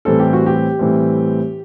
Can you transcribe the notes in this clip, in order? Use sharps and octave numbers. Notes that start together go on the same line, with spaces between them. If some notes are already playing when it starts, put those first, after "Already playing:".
A2 E3 G3 C4 A4
G4
F#4
G4
A2 E3 G3 C4